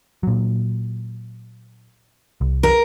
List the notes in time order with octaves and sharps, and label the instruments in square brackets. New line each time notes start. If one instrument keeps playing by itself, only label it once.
[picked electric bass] A#2 F#3
C2
[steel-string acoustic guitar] A#4